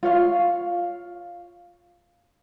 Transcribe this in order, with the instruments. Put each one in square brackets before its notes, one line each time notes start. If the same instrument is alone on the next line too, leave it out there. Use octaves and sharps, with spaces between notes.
[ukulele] F4 C#5 F5